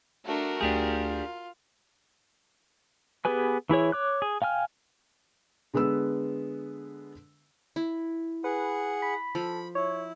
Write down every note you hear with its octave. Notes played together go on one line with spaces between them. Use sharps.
A3 D4 F#4 A#4
D2 A3 D4 F4 G4 G#4 G6
B3 G4 G#4 B4 G#5
E3 E4 G#4 C#5
C#5 D6 F#6
G#4
F5 G5 G#5 F6
D3 G#3 B3 B4 E6
E4
G#4 B4 F#5
B5
F3 A4 B5
E4 C#5